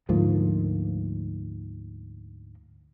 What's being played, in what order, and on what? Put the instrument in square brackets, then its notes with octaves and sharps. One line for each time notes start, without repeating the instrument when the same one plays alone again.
[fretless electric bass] D2 G#2 F3 A#3